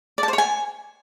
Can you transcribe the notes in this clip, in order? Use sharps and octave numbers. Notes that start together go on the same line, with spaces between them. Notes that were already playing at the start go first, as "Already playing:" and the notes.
D5
A5
C5
C#5
G#5